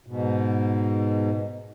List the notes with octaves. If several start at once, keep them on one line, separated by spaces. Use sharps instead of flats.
G#2 B2